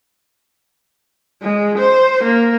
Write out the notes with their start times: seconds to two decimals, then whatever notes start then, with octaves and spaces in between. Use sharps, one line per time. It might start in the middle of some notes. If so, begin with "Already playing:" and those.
1.42 G#3
1.78 C5
2.24 A#3